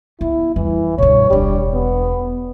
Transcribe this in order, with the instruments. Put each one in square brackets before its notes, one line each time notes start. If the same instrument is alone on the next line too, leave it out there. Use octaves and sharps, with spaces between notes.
[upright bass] B3 [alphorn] E4
[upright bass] F2 G3 [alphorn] E3
[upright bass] G2 B2 [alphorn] C#5
[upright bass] E1 D4 [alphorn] G3
[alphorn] B3